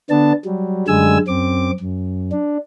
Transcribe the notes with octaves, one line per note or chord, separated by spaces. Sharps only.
D3 B3 D4 A5
F#3 G3
F#2 D3 G3 G#3 G#5 E6
F#2 C4 D6
F#2
D4